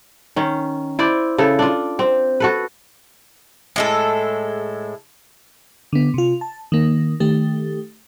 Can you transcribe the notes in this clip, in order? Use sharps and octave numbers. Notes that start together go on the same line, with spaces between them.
D#3 C#4
E4 C5 D5
C#3 E4 A4
D4 F4
C4
F#4 A4 B4
A2 G#3 A4
D3 B3
C3 F4
A5
D#3 A#3
D#3 A3 G4